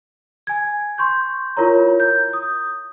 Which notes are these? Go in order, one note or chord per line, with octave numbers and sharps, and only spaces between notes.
G#5 G#6
C6 C#6 G6
E4 F4 A#4 C#5 A#5
G6
D#6